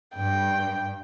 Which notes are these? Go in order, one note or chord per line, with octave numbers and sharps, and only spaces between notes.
G2 G5